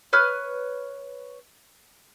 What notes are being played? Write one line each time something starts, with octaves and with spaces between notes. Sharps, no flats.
B4 C#5 F6